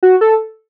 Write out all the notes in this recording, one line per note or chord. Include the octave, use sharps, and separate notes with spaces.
F#4
A4